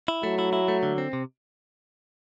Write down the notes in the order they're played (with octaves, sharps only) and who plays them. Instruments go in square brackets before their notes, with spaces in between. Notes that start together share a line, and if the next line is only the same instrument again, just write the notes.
[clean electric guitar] E4
[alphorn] F#3 [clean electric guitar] A3
[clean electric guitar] E4
E4
A3
D3
C4
C3